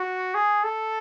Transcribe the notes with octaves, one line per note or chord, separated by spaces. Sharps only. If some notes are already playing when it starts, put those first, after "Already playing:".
Already playing: F#4
G#4
A4